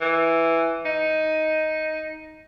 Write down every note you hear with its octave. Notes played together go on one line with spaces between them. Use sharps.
E3
D#4